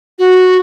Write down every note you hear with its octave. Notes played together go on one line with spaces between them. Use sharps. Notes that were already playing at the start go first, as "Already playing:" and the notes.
F#4